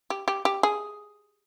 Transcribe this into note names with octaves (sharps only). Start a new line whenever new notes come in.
G4
G4
G4
G#4